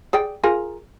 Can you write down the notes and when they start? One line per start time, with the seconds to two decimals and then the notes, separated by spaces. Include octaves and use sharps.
0.13 G#4 D5 G5
0.44 F4 G#4 A#4